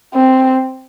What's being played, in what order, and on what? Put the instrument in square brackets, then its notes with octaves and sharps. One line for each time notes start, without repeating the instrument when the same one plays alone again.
[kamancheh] C4